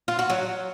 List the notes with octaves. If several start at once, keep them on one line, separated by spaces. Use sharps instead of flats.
F4
F#4
F#3